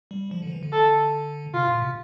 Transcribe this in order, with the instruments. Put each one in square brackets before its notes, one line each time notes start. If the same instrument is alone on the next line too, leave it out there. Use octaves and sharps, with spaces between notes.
[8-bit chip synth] G3
F3
D3
F3
E3
D3
[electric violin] A4
[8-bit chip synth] C3 [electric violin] F4
[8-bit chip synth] A#2
C3